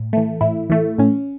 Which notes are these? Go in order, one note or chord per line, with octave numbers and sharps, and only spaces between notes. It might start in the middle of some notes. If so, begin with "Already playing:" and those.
Already playing: A2
E3 A3
A2 E4
E3 A3
A2 C#4